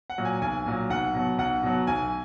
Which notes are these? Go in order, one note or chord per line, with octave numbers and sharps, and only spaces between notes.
F#5
A#2 F#3
G#5
B1 G#5
A#2 F#3
B1 F#5
B2 F#3
B1 F#5
B2 F#3
B1 G#5